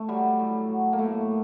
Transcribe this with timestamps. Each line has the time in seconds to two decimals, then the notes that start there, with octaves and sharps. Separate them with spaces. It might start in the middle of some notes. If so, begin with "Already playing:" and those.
Already playing: A3
0.08 F#3 G3
0.39 A2
0.69 F#3
0.93 A#3
0.99 A2 A3